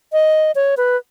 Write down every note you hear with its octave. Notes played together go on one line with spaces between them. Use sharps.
D#5
C#5
B4